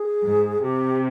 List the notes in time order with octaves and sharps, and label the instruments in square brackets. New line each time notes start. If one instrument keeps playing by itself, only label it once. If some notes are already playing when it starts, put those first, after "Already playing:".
Already playing: [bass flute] G#4
[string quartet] G#2
[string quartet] C3 [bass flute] G4